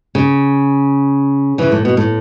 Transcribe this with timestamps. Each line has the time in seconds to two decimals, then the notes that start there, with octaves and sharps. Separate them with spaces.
0.15 C#3
1.58 C#3 E3
1.72 A2
1.85 B2
1.97 A2